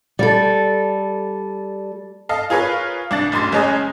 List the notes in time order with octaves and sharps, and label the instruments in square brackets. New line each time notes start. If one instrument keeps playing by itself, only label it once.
[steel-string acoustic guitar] G3 A4
[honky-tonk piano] A4 D#5 F5
F4 G#4 A#4 B4 C#5 F5
C2 D4 A6
F1 B1 F#2 C6 A6
F#1 G#3 C#4 D#5 G#5 A#5